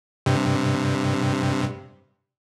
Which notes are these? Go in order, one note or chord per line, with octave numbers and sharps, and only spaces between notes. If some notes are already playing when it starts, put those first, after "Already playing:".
G2 C3